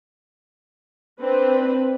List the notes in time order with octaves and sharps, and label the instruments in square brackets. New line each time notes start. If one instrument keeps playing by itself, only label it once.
[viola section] C4 D4 B4